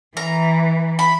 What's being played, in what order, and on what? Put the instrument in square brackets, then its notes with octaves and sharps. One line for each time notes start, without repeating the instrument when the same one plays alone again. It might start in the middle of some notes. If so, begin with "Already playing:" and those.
[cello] E3 [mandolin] A#5
[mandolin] B5